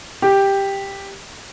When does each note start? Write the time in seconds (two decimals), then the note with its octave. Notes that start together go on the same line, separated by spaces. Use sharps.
0.22 G4